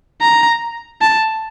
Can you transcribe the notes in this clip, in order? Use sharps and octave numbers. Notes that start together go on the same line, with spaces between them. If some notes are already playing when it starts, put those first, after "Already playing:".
A#5
A5